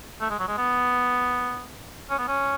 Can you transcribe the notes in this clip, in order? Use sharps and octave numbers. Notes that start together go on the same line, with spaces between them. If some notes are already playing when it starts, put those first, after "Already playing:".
A3
G#3
F#3
G#3
B3
C#4
B3
C#4